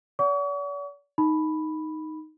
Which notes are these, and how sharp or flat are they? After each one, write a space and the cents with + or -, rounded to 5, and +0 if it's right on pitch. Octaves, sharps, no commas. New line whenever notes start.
D5 -45 F#5 +0 C#6 +40
D#4 +0 B5 +0